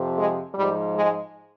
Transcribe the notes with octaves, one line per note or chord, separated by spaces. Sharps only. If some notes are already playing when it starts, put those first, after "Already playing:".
Already playing: F2 C3 F3
G#3
G#2 F3 G3
G#3